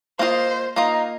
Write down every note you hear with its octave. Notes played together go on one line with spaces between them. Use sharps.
A#3 F4 C5 D#5
A#3 D#4 F4 D#5